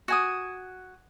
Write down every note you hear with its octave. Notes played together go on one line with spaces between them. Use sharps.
F#4 G#5 D#6